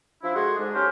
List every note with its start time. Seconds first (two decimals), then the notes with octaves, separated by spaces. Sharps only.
0.22 F3 D4 E4
0.34 G#3 F#4 G#4 A4 F#5 C6
0.58 G#2 G#3 D4
0.74 F#3 C#4 G4 A4 A#4 C5